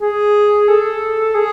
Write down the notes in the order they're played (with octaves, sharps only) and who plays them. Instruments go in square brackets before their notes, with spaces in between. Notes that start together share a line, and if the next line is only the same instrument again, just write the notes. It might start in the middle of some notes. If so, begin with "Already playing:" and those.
[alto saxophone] G#4
A4
G#4